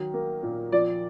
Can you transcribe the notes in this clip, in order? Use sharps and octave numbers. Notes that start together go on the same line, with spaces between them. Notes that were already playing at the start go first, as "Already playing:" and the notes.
Already playing: D#3 F#3
A#3
A#2
F3 D5